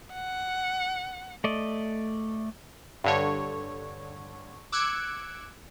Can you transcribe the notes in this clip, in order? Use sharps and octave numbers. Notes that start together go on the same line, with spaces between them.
F#5
A3 D5 D#5
G2 D3 C#5
D6 E6 F#6 G#6 C#7 D7